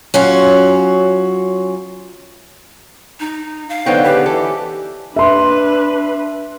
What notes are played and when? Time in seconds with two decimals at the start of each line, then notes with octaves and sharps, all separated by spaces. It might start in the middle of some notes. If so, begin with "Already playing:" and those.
0.14 F#3 C#4 F4 F#4
3.20 D#4
3.69 F5
3.86 D3 B3 D#4 C5 C#5 G5
4.04 C#3 G4 B4
4.26 E3 A4
5.16 D4 B4 E5 C6